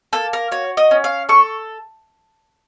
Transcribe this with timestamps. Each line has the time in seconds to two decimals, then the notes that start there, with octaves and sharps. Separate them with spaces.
0.13 A#3 A4
0.33 A#4
0.51 F#4 C#5
0.77 D#5
0.91 C#4
1.04 F5
1.29 A4 C#6